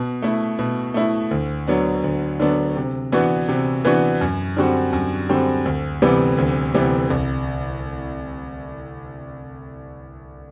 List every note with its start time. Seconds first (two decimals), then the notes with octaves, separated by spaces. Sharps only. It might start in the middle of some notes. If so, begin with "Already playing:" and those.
Already playing: B2
0.22 A3 E4
0.59 B2
0.94 A3 E4
1.31 D2
1.67 D3 F#3 B3 D4
2.04 D2
2.40 D3 F#3 B3 D4
2.77 C3
3.12 E3 B3 D4 F#4
3.48 C3
3.85 E3 B3 D4 F#4
4.21 F#2
4.57 D3 G3 C4 F#4
4.93 F#2
5.29 D3 G3 C4 F#4
5.65 D2
6.02 C3 E3 G3 B3
6.38 D2
6.74 C3 E3 G3 B3
7.10 C2